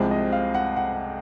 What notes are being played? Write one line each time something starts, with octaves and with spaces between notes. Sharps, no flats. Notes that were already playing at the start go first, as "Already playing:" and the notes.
Already playing: C2 C3 F3 G#3
D#5
F5
F#5
F#5